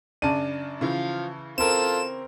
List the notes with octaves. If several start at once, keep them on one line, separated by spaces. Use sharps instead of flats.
F#2 C#3 D4 A5 D#7
C#3 E3 F3 F5
C4 F4 A4 A#4 E7